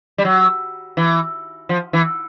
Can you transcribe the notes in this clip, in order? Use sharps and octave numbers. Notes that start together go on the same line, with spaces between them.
G3
F#3
E3
F3
E3